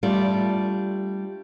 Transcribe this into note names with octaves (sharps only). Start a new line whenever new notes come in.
G3 A3 D4 F4